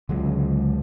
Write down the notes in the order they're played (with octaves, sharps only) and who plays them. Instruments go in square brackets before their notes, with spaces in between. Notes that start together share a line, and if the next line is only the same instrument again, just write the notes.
[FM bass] C#2 [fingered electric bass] D3 F#3 G#3